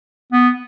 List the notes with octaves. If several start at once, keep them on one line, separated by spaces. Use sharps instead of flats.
B3